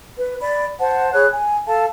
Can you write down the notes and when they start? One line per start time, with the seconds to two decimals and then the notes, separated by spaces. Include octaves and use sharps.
0.16 B4
0.41 D5 B5
0.79 C5 F#5 A5
1.13 G#4 C#5 B5 F#6
1.32 G#5
1.67 A4 F5 A5